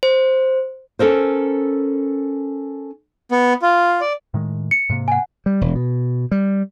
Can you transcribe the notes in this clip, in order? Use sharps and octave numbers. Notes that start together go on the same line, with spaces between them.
C5
C#4 A4 A#4 C5
B3
F4
D5
A2 D#3 G#3
C#7
G#2 C3 A#3
F#5 G#5
G3
E1
B2
G3